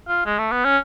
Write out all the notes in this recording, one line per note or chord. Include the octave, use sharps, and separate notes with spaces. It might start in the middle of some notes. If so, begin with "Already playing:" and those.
F4
G#3
A3
B3
C#4